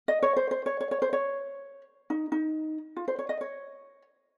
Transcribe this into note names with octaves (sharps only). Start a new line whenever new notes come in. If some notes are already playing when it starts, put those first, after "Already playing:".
D#5
C#5
C5
C5
C#5
C#5
C#5
C5
C#5
D#4
D#4
F4
C5
C#5
D#5
C#5